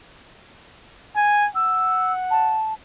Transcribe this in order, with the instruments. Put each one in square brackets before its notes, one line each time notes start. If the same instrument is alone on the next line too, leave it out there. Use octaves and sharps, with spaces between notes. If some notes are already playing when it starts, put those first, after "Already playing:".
[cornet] G#5
[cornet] F#5 [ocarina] E6
[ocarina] A5